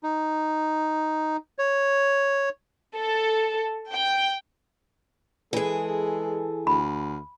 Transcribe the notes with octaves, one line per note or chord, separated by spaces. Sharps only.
D#4
C#5
A4
G5
E3 G#3 G#4 A4
D2 B5